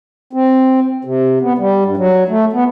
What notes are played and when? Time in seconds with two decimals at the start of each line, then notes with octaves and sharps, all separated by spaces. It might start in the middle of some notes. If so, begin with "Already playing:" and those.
0.33 C4
1.05 C3
1.41 B3
1.58 G3
1.85 G2
1.97 F#3
2.29 A3
2.53 B3